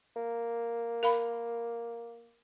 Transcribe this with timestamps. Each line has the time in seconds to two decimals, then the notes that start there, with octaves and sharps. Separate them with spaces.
0.16 A#3
1.03 A#4 F5 B5